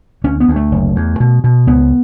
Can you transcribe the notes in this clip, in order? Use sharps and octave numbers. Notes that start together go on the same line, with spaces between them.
D2 C#4
B3
D2
A3
F#1
E2
B2
B2
C#2 B3